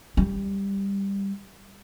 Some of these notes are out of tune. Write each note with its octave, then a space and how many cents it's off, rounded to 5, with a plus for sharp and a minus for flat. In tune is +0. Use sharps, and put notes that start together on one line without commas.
G3 +10